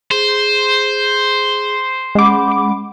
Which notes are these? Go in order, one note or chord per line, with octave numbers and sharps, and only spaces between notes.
G#4 C5
G#3 C#4 F#5 B5 D6